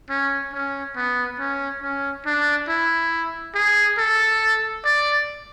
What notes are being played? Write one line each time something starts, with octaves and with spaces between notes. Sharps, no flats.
C#4
C#4
B3
C#4
C#4
D4
E4
G#4
A4
D5